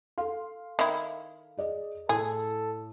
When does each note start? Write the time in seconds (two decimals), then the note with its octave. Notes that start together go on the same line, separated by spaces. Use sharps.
0.18 A4 F5 C6
0.79 D#3 E4
1.57 G#4 D5 D#5
2.09 A2 G#4 A4